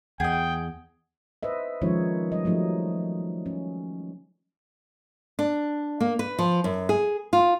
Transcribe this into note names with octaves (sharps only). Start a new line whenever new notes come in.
E2 G#4 D#5 F#5 G5
B4 C5 D#5 E5
D#3 F3 G#3 C#4 D#4 C#5
G3 D#5
F3 F#3 A3 D#4
C#4
D4
A#3
B4
F3
F#2
G#4
F4